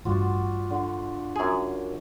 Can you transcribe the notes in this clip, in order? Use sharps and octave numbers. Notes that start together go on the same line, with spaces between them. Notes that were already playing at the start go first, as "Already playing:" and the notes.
A1 G2 F4 F#4 D5
D3
F#2 G#4